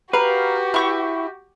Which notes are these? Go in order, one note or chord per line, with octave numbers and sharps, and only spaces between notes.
F#4 G4 A#4 B4 F5
E4 C#6 G6